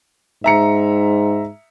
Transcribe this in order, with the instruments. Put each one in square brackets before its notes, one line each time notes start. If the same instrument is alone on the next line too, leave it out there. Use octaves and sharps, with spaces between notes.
[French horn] G#2 [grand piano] E5 A#5 C#7